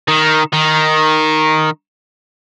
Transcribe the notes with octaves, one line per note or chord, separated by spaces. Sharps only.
D#3
D#3